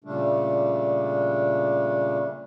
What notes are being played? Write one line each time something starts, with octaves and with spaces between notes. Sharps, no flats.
A#2 C#3 G3 A3 D4